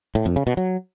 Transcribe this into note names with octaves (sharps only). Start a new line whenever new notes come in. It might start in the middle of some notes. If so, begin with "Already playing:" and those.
A2
F2
C#3
B2
F#3